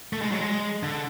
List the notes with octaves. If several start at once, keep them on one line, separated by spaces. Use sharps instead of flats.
A3
G#3
F#3
G#3
D3